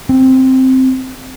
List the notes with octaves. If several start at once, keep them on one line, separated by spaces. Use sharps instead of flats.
C4